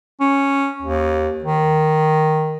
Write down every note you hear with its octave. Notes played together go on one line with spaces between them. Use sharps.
C#4
D#2
D#3